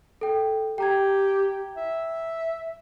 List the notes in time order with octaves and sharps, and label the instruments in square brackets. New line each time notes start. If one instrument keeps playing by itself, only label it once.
[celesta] A4 G5
[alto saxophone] G4 [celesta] G5 A#5 G#6
[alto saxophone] E5